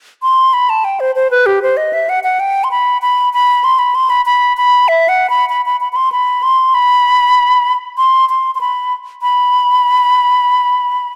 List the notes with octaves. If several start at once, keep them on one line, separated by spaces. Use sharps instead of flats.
C6
B5
A5
G5
C5
C5
B4
G4
C5
D#5
E5
F#5
F#5
G5
C6
B5
B5
B5
C6
B5
C6
B5
B5
B5
E5
F#5
B5
B5
B5
B5
B5
C6
B5
C6
B5
C6
C6
C6
B5
B5